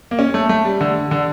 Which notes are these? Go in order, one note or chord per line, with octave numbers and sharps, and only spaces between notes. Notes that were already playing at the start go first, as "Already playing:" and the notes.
A#3
C#4
A3
A3
G3
D3
D3